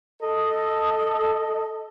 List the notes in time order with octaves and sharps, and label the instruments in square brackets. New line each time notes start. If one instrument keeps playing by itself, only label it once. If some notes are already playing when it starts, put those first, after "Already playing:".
[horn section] A4 D#5